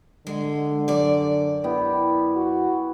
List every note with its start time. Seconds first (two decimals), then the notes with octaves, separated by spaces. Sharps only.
0.27 D3 G#3
0.88 F#2 D5
1.64 B3 E4 G4
2.36 F#4